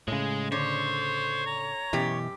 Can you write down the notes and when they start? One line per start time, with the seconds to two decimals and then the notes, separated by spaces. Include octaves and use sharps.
0.08 A2 C#3 G#3
0.52 D3 C5 C#5
1.47 A#5
1.93 F#2 B2 E3 G4